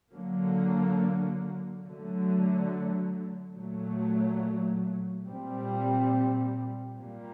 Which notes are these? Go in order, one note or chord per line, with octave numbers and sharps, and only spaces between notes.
D3 F#3 A#3
D3 F#3 A3
A#2 F#3 A3
A#2 G3 C4
A#2 G3 A#3